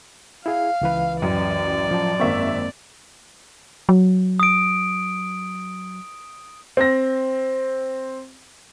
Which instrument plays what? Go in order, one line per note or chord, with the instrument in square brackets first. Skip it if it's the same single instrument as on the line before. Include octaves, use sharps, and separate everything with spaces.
[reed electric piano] E4 G#4 [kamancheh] F5
[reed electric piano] C#2 E3 B4
[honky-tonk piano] A1 F#2 [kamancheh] D5
[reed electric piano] F3 A5
[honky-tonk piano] G#1 E5 C#6 [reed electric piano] F#2 A#3 C4
[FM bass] F#3
[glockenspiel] D#6 D7
[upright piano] C4 A#6